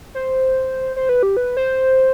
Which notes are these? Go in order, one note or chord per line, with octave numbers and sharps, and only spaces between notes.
C5
C5
B4
G4
B4
C5